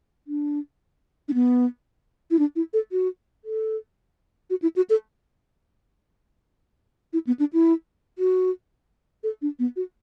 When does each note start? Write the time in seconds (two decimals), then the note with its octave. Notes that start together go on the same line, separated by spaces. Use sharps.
0.27 D4
1.28 D4
1.34 B3
2.31 E4
2.39 D4
2.56 E4
2.73 A4
2.92 F#4
3.45 A4
4.50 F#4
4.62 E4
4.76 F#4
4.90 A4
7.13 E4
7.27 B3
7.40 D4
7.53 E4
8.19 F#4
9.23 A4
9.42 D4
9.59 B3
9.76 F#4